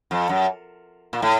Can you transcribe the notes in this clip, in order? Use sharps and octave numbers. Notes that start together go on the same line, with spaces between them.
F2
F#2
A#2
A2